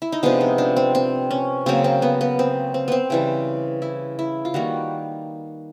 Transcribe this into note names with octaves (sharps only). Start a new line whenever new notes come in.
E4
D#4
C3 F3 G#3 B3 D4
D#4
D4
C4
C4
C#4
C#3 F#3 A#3 C4
C4
B3
B3
C4
C4
B3 C4
C#3 E3 G3
E4
E4
F4
D#3 G3 A#3 F#4